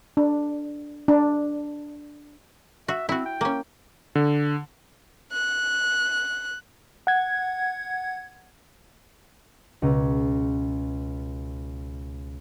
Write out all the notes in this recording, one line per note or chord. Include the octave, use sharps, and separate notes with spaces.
D4
D4
F#4 E5
C4 E4 F#4
G5
A#3 C#4
D3
F#6
F#5 G#6
C#2 B2 C#4 A#5 E6